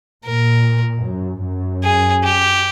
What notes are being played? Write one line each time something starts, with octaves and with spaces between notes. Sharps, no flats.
A#2 A#4
F#2
F#2
G#4
G4